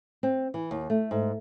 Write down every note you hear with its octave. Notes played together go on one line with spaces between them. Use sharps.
C4
E3
D#2
A3
G#2